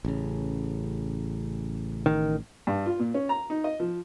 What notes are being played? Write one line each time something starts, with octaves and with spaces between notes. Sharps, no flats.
A1 C#3
D#3
G2
F4
A#2
C#4
A#5
D#4
D#5
F3